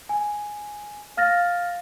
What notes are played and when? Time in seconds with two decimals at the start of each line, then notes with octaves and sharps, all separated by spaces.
0.09 G#5
1.17 F5 F6 A6 A#6